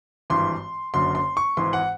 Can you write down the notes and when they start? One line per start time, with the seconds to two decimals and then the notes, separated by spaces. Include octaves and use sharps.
0.30 G#1 G2 E3 C6
0.94 F#1 F#2 D3 C6
1.15 C6
1.37 C#6
1.57 G#1 G#2 E3 C6
1.73 F#5